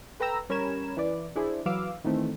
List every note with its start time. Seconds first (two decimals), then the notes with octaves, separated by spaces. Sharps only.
0.20 A4 B4 G5 A#5 E6
0.49 G3 C#4 A#4 B5 G#6 E7
0.97 E3 B4 D5
1.36 D4 E4 G#4 C5
1.66 E3 F#3 B4 F5 D6 E6
2.05 D#3 E3 A3 C4